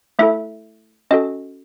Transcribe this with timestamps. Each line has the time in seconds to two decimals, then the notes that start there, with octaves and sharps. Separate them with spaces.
0.19 A3 E4 A4 E5
1.11 C#4 F#4 A4 D#5